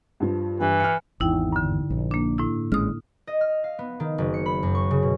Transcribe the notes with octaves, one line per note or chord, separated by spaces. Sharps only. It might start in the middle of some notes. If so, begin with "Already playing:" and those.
G2 F3
G2 E3
F6 C#7
G#1 E2 D#4 E4 G5
G2 D3
A#1
A#3 D4
A2 D4 E4
G#1 G#3 C#4 D#6 F6
D#5
F6
F5
B3
D#3
F#1
C#7
B5
F#2
C#6
C#3
B2